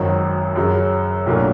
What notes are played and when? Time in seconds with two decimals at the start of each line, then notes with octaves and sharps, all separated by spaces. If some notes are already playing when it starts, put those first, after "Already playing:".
Already playing: G#1 F#2 D#3 F#3
0.55 F#2 C#3 F#3
1.26 B1 A2 F#3 A#3 D4